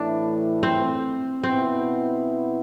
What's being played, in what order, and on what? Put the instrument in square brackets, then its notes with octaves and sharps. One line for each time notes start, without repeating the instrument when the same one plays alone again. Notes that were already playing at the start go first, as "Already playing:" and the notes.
Already playing: [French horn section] A2 E3 A3 E4 [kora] D4
[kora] C4
[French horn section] B2 B3 E4 [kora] C4